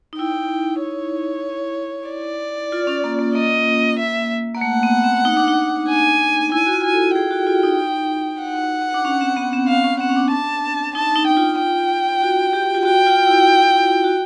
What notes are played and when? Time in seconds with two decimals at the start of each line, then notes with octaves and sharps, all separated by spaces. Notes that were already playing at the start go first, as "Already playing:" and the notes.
0.13 D#4
0.19 E4 G5
0.81 C#5
2.09 D5
2.72 F4
2.87 C#4
3.04 A#3
3.19 A#3
3.35 A#3 D#5
3.99 E5
4.55 A#3
4.61 A3 F#5
4.83 B3
5.04 C4
5.25 D#4
5.37 D4
5.48 D#4
5.89 G#5
6.52 E4 G#5
6.66 F#4
6.73 F4
6.84 G#5
6.94 A4
7.15 G#4 G5
7.31 F#4
7.47 F4
7.63 D#4
8.42 F#5
8.94 D4
9.05 C#4
9.21 C4
9.37 B3
9.53 C4
9.68 C4 F5
9.84 C#4
10.00 C4 F#5
10.09 C#4
10.16 D4
10.31 A5
10.95 D#4 A5
11.16 D#4
11.27 G5
11.37 F4
11.59 G5
12.22 F#4
12.53 G4
12.75 F4
12.85 F#4 G5
13.07 F4
13.27 E4
14.04 F#4